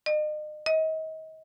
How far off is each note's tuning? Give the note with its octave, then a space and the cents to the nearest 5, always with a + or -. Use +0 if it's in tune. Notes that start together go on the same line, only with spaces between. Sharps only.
D#5 -40
D#5 +35